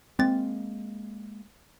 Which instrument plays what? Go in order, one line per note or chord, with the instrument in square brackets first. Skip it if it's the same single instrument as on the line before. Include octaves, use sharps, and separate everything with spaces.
[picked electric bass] G#3 A#3 [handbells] C4 A6